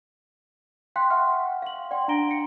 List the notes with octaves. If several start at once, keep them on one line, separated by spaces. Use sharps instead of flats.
F5 G5 C6 F#6 B6
E5 F#5 G5 C6 C#6 F6
F5 F#7
D5 F#5 G5 C6
D4 F5 A#5 A#6 D7 G7
C#7